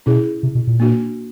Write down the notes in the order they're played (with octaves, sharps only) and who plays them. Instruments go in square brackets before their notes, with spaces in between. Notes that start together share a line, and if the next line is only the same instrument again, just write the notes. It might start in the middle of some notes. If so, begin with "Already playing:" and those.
[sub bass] B2 [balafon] C#4 E4 G#4
[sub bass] C3
B2
A#2
[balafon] A#3 D4 F#4